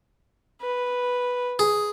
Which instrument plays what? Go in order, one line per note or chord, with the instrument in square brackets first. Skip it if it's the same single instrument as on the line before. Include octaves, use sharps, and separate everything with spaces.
[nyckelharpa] B4
[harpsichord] G#4